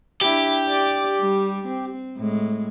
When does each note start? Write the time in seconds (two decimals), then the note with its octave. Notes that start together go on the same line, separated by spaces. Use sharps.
0.21 D4 E4 G4
0.68 D5
1.19 G3
1.67 C4
2.17 A2 G#3